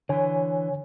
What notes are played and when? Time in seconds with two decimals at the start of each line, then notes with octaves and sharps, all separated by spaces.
0.09 D3 E3 C#5 G#5